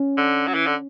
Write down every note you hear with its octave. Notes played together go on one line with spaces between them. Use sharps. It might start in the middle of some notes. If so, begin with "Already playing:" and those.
Already playing: C#4
D3
F#3
E3
D3